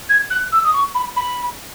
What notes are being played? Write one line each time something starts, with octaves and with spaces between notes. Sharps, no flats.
G#6
F#6
E6
D#6
C#6
B5
B5